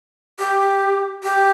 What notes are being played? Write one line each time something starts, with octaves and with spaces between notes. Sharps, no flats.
G4
G4